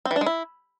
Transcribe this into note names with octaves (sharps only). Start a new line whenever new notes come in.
C4
E3
D4
G#3
E4